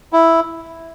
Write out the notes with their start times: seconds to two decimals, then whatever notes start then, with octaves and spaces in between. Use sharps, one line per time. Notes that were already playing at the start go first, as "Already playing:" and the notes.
0.13 E4